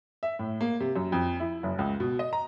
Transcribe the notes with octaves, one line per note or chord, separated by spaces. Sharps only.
E5
A2
A#3
C3
F#2
F2
E4
F#1
C#2
B2
D#5
A#5